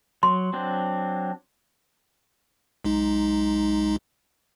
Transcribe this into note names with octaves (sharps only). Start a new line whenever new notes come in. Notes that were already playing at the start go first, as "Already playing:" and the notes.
F#3 C6
F#3 C4 D4
B1 G#3 D#4